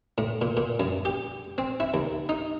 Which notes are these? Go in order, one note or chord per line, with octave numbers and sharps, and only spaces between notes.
A2
A#2
A#2
F#2
G4
C4
E4
D#2
D#4